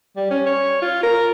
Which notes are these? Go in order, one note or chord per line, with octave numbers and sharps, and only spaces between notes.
G3
C#4
C#5
F4
A#4